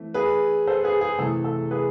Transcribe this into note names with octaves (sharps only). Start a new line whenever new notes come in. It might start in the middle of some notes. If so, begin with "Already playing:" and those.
Already playing: E3 A3 C4
G#4 B4
A4 C5
G#4 B4
G#4
C3 E3 A3 C4 A4
A4
G#4 B4